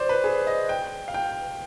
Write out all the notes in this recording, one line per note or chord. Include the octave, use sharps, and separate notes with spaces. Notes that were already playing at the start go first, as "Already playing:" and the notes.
Already playing: C5 D5
B4
G#4
D#5
G5
F5
G5